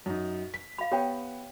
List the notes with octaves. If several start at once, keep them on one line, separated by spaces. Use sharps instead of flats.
F#2 D#4
B6
F5 B5
B3 G4 C#5 G5